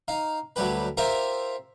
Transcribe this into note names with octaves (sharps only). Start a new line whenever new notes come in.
D#4 F5
D2 F#3 G3 G4 B4
F4 G4 A#4 C5 E5